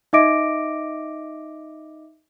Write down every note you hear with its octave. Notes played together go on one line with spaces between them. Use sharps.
D#4 D#5 E5 D6 A#6 D7